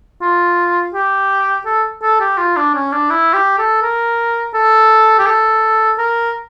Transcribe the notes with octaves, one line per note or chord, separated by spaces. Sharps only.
F4
G4
A4
A4
G4
F4
D4
C#4
D4
E4
G4
A4
A#4
A4
G4
A4
A#4